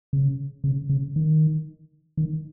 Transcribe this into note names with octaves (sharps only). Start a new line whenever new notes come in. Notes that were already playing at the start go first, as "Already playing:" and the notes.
C#3
C#3
C#3
D#3
D#3